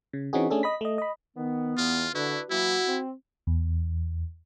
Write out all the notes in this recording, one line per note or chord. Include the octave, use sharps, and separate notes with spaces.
C#3
E3 C4 C#4 D#4 F#4 G#4
A3 C#4 D4 G#4 A4
D#5 B5 B6
A3 D#5
D#5 B5
D#3 B3
E2 F4
D3 D4 E4 F#4 B4
E3 F#3 A#3 E4 F#4
C4
E2